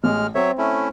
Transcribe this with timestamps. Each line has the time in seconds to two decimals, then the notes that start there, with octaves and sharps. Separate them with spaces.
0.04 A1 G#3 F6
0.35 F#3 C4 C#5 E5
0.58 A3 C#4 E4